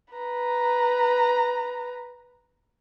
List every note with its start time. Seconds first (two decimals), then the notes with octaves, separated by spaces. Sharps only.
0.14 B4 A#5